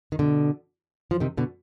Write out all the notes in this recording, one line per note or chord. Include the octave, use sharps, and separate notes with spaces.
D#3
B2 D3
F3
C3 D#3
B2 D3